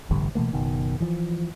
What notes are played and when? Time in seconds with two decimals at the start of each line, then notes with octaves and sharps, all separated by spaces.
0.10 E1 A1 G2 D3
0.35 B2 E3 A3 A#3
0.53 F#1 B2 D#3
1.00 E3 F3